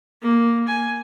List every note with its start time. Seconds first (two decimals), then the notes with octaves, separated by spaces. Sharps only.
0.22 A#3
0.67 G#5